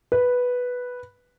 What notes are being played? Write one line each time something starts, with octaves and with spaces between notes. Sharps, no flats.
B4